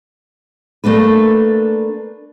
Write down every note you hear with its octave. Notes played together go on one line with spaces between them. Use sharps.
A3 A#3 D4 B4